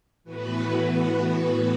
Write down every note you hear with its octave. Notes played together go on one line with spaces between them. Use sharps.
A2 E3 B3 F#4 B4